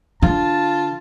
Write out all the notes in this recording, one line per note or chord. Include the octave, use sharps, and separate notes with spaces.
D3 F4 A5